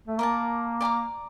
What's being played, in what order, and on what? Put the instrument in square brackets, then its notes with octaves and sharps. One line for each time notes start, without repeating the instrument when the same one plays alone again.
[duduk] A3
[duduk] A#3 [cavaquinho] A#4 D5 A5
[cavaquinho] D5 G5 A#5 D6